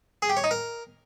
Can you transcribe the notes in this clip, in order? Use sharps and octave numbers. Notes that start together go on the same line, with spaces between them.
G#4
G4
C#5
D#4
A#4